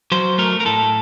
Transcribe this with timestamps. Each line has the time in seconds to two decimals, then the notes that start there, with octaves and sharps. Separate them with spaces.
0.12 F#3 C5
0.38 A3 A#4
0.60 A#4
0.65 A2 A4